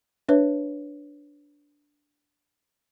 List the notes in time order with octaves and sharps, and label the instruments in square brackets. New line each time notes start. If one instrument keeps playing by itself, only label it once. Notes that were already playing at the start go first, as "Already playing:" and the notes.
[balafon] D4 B4 C#5 E5